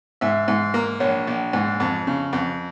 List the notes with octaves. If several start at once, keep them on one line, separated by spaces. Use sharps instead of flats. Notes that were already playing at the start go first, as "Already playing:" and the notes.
G#2 E5
G#2
A#3
A#1 C#5
A#1
G#2
F2
C#3
F2